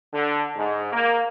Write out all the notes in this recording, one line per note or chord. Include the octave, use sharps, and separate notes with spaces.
D3
G#2
A#3